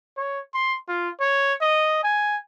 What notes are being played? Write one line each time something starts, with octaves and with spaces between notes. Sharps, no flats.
C#5
C6
F4
C#5
D#5
G#5